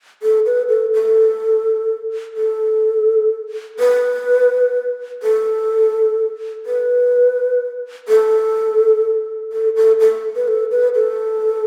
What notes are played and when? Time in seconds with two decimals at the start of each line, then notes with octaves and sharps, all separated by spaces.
0.23 A4
0.46 B4
0.69 A4
0.94 A4
2.37 A4
3.80 B4
5.23 A4
6.66 B4
8.08 A4
9.52 A4
9.76 A4
10.00 A4
10.36 B4
10.48 A4
10.72 B4
10.95 A4